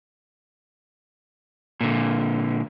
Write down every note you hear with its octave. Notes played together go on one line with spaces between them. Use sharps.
A#2 D3